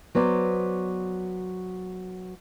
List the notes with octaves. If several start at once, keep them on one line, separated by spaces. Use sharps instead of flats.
F#3 B3 C5 D5